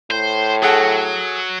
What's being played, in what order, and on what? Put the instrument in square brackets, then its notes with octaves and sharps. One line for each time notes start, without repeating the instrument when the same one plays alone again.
[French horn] A2 [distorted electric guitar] C5
[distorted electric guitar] F#3 [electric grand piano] G#4 A4 F#5